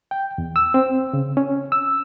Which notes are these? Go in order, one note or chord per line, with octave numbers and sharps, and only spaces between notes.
G5
E2
E6
C4
C#3
C#4
E6